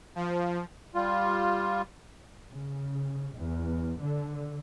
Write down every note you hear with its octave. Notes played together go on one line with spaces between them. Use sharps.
F3
G3 F4
C#3
E2
D3